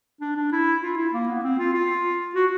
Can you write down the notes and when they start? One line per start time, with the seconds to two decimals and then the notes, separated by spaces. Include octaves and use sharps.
0.21 D4
0.36 D4
0.52 E4
0.82 F4
0.97 E4
1.13 A#3
1.28 B3
1.43 C4
1.58 F4
1.74 F4
2.35 F#4